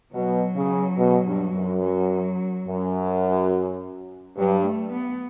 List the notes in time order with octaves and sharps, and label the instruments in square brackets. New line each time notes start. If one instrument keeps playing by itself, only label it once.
[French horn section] B2 [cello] F#3
[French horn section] C#3
B2
G2
F#2
[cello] F#3
[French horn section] F#2
[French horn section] G2 [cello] F#3
[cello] A3
B3